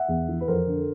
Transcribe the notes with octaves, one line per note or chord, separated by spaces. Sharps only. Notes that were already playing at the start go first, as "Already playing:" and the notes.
Already playing: E5 F#5
E2
E3
B4
F2 A#4 C5
D3